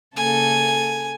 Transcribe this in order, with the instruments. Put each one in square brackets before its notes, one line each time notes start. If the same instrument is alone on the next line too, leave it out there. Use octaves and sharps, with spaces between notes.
[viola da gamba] C#3 A#3 A4 [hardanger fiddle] G#5